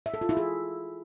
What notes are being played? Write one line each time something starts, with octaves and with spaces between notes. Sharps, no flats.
E5
A4
F4
E4
G#4